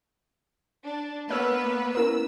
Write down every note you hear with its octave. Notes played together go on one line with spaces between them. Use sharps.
D4
A#3 B3 B4 C#5 E6 F6
C#4 E4 A#4 E6